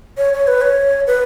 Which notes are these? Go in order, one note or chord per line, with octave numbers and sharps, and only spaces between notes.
C#5
C#5
B4
C#5
B4